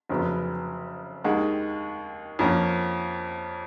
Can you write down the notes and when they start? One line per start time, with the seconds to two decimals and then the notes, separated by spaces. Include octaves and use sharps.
0.09 F1 F2 C#3 F#3 B3
1.24 D#2 D#3 G#3
2.39 F2 F3 A#3 C#4